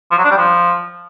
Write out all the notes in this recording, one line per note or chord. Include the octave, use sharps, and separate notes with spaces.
F3
F#3
D4
G3
F3